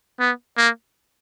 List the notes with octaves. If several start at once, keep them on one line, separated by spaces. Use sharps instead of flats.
B3
A#3